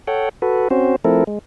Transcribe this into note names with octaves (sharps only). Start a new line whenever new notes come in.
A4 C#5 F#5 G5
F#4 A4 B4
C4 C#4 F#4 C5
F3 A3 C4 E4 A4 A#4
G#3